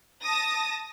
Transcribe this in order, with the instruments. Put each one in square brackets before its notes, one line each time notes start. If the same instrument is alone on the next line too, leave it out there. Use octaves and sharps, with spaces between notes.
[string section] A5 D#6 A#6